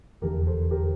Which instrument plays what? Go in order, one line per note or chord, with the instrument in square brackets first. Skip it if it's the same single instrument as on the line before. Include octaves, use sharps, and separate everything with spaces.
[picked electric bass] F1 E2 D3 [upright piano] G4 A#4
[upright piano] A4 C5
G4 A#4